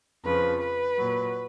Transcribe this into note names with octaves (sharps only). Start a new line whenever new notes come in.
F2 C#3 F3 B4
B4
A#2 F#3